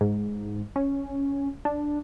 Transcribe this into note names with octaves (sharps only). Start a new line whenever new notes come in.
G#2
C#4
D4